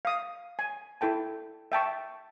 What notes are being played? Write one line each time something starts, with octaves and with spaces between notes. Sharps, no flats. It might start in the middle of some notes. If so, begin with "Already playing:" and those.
F5 D#6
G#5
E4 A4 G5 A5
E5 G5 A5 C#6